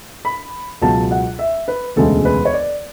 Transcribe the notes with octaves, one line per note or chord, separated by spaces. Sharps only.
B5
C#2 B2 F#3 A5
F#5
E5
B4
E1 D2 C#3 G#3 A4
B4
C#5
D5